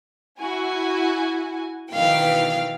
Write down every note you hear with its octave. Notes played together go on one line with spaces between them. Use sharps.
E4 F#4 G#5
B2 D#3 E3 F5 G5